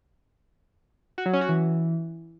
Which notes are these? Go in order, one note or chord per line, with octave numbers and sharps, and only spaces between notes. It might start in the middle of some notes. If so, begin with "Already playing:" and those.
F#4
F#3
C#4
F#4
E3